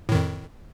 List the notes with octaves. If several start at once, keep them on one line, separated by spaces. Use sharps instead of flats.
F2 A2 D#3